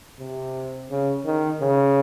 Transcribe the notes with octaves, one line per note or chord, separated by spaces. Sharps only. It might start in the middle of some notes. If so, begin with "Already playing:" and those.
C3
C#3
D#3
C#3